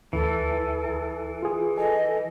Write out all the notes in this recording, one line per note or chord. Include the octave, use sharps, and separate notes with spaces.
D2 E3 A4
F4 G#4
A4 D#5 G#5